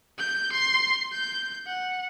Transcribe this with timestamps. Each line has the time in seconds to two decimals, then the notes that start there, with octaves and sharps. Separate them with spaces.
0.18 G6
0.52 C6
1.12 G6
1.67 F#5